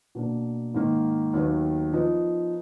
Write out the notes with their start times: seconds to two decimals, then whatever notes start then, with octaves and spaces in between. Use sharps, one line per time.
0.15 B2 A#3 D4
0.74 G#2 D#3 A#3 D#4
1.33 D#2 D#3 F#3 B3
1.93 F3 B3 D#4